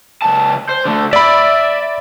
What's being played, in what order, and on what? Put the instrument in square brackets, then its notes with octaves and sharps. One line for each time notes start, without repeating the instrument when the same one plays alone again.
[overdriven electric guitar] C#2 A5
C5
D3 A3
[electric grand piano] D5 B5 [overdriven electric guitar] E5